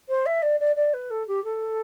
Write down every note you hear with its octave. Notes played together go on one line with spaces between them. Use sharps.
C5
E5
D5
D5
D5
B4
A4
G4
A4